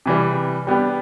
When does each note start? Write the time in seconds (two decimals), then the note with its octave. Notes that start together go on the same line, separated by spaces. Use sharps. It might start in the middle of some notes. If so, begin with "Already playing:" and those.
0.06 C3 E3 G3
0.67 G3 B3 D4 G4